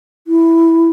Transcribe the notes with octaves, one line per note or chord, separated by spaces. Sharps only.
E4